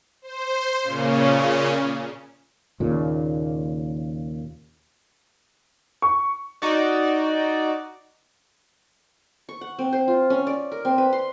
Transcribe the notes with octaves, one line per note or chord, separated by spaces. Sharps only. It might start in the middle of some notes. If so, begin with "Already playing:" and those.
C5
A#2 C#3 C#4
D#2 A#2 C#3
C#6
D#4 F#4 D5
C#6
F#5
C4
C5
F4
C#4
D5
A#4
C4
B4
C6